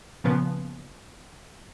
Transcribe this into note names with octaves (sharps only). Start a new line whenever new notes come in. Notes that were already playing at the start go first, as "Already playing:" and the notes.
A#2 C#3 F3 B3